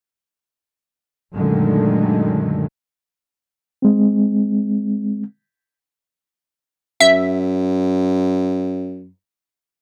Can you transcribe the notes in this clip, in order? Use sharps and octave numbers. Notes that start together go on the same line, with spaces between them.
F#2 A#2 D3 D#3 G#3 A3
G#3 C4
F#2 E5